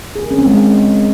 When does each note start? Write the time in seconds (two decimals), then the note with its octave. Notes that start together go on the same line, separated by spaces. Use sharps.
0.16 G#4
0.23 A#4
0.31 C#4
0.38 C4
0.46 G#3